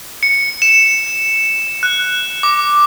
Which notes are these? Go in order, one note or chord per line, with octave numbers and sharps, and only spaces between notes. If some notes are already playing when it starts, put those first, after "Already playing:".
C#7
E7
F#6
D6